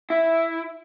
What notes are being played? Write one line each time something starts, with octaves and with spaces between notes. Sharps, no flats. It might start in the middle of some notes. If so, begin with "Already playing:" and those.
E4